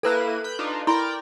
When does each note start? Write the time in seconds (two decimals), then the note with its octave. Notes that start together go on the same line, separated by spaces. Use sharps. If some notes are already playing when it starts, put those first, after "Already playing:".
0.03 A#3 E4 A4 B4 F#6 D#7
0.44 B5 G6
0.59 D4 D#4 F4
0.87 E4 A#4 D5 G5 B5 C6